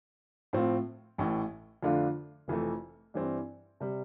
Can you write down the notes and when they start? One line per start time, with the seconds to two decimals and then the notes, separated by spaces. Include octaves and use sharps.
0.53 A2 F3 C4 F4
1.18 A1 A2 E3
1.83 F2 D3 A3 D4 F4
2.48 F1 F2 E3 A3
3.14 G2 E3 G3 C4
3.80 C3 G3